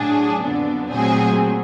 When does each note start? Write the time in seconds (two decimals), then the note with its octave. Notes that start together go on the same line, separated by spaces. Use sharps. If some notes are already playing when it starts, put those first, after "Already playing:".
Already playing: A2 F#3 A3 D4 G#4
0.41 F2 D3 F#3 B3 D4
0.91 A#2 F#3 A3 C4 G#4